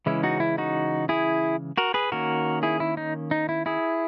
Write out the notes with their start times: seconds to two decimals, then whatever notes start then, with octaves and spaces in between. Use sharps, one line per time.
0.06 C#3 E3 G#3 C#4 E4
0.23 D#4 F#4
0.40 E4
0.58 D#4 F#4
1.09 E4 G#4
1.78 F#4 A#4
1.94 G#4 B4
2.12 D#3 A#3 C#4 F#4 A#4
2.63 E4 G#4
2.80 E4
2.97 D#4
3.31 D#4
3.49 E4
3.66 E4 G#4